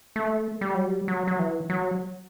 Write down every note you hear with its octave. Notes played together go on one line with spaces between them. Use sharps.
A3
G3
F#3
G3
F#3
F#3
E3
F#3